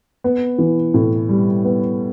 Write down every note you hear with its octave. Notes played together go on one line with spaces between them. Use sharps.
B3
E3
A2
G3
B3